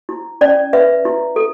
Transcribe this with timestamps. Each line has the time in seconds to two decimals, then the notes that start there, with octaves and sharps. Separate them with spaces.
0.09 E4
0.41 C#4 D5
0.73 B4 E5
1.05 E4
1.36 A4